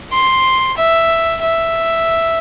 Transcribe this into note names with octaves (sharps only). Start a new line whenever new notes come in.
C6
E5
E5